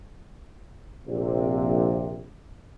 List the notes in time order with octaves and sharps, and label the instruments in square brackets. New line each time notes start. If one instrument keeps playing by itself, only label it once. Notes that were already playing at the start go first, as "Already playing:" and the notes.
[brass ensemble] A#1 C3